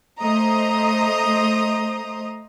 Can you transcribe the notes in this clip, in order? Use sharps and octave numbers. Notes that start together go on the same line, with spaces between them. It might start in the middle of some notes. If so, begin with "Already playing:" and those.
A3 C5 D#5 A#5 D#6